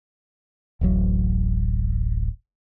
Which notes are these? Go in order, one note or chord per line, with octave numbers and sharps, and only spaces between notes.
D1 A1 F#3